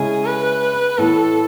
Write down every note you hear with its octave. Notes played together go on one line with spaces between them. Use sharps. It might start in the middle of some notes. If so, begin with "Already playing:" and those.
Already playing: C#3 G#3 C#4 E4 G#4
B4
A2 E3 B3 A4